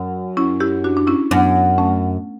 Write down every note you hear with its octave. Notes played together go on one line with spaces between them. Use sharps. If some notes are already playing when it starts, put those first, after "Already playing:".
Already playing: F#2
C#4 E4
E4 G4
D4 F#4
D4
C#4 E4
F#2 B3 D4
A3 C#4